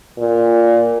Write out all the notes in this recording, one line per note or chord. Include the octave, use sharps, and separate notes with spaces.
A#2